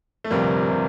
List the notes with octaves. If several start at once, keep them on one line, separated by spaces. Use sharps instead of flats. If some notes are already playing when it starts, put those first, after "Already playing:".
A3
G1 F2 C3 G3 A#3
C3